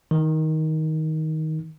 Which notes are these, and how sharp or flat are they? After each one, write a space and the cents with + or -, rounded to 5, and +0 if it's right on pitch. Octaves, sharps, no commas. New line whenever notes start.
D#3 +15